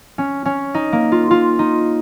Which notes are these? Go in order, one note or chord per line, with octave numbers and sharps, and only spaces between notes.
C#4
C#4
D#4
A#3
F4
F4
D#4